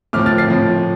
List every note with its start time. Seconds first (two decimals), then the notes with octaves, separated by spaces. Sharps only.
0.13 A2 F3 C4 D6 F6
0.26 F6 A6
0.38 A6 C7
0.50 A2 F3 C4